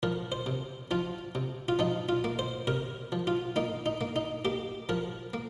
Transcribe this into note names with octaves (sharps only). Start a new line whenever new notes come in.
F3 A#4
C5
C3
F3 F4
C3
F4
F3 D#4
F4
A#3
C5
C3 A#4
F3
F4
A#3 D#4
D#4
A#3
D#4
A#3 G4
F3 A#4
A#3